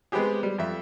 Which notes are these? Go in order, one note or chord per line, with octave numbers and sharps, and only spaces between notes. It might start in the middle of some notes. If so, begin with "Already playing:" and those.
G#3 B3 C4 G4 G#4
G3
F2 E5